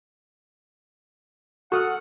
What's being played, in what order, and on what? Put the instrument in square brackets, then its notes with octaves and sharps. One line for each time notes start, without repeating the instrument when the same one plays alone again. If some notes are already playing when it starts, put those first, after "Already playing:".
[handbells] F#4 [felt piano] A4 D#6 F6 [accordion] F#5